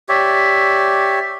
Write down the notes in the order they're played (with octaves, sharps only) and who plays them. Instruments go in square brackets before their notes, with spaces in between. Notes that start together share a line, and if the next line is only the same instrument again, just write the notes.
[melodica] G4 C#5 D5 E5